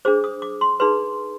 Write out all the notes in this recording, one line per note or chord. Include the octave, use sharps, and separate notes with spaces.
D4 G#4 C5 D6
D#6
D6
C6
D#4 G#4 B4 C6